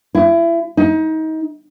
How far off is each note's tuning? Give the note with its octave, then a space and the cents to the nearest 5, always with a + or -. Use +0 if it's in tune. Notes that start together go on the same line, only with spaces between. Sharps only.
E4 +30
D#4 +30